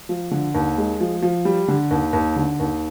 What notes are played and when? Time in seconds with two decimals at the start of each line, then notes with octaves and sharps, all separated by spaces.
0.09 F3
0.31 D3
0.55 D#2
0.78 G#3
1.01 F3
1.22 F3
1.45 G3
1.68 D3
1.91 D#2
2.13 D#2
2.36 D3
2.60 D#2